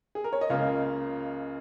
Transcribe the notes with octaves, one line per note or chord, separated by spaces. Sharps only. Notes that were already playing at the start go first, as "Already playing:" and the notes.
G#4
A#4
C#5
D#5
C#2 C#3 A#3 F4 F5